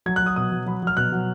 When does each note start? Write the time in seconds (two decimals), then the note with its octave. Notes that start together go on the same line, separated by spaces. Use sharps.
0.06 F#3 G#6
0.16 F#6
0.22 F#3 D#6
0.36 B2 D#6
0.52 F#3
0.66 F#3 B5
0.82 F#3 F6
0.97 B2 F#6
1.12 F#3